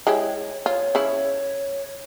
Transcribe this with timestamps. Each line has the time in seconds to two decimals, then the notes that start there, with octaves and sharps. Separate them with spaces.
0.07 G#3 E4 G4 C#5
0.66 F4 C#5
0.95 C#3 E4